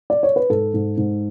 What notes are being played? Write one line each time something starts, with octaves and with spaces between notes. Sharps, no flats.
D5
C#5
B4
G#2 A4
G#2
G#2